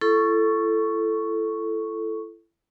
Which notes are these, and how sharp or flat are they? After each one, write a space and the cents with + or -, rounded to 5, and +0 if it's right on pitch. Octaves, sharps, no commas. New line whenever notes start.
E4 +35 A4 -5 C#6 +0